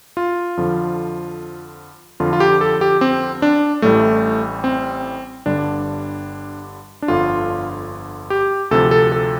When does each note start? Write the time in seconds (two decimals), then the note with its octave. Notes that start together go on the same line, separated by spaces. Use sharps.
0.17 F4
0.57 F2 D3 F3
2.20 F2 D3 F3 F4
2.33 F4
2.40 G4
2.61 A4
2.81 G4
3.01 C4
3.42 D4
3.82 A1 A2 G3 A3
4.64 C4
5.46 G1 G2 D3 G3 D4
7.02 D4
7.08 G1 F2 D3 F4
8.30 G4
8.71 D2 C3 F3 A4
8.91 A4
9.12 A4